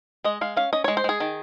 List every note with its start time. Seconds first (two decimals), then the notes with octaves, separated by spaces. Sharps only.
0.24 G#3 D#5
0.41 G#3 F5
0.56 C#4 F5
0.73 C#4 D#5
0.84 G#3 C#5
0.97 C5
1.04 G#3 G#4
1.20 D#3